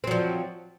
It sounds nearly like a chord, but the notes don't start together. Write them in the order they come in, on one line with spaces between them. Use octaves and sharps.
C4 F#3 F3